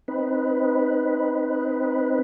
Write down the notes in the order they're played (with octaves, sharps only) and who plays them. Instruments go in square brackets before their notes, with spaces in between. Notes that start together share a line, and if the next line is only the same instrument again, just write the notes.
[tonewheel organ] C4 D#4 B4